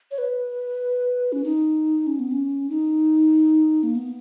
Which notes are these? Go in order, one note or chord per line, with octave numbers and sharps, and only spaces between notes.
C#5
B4
C#4
D#4
C#4
B3
C#4
D#4
A#3
B3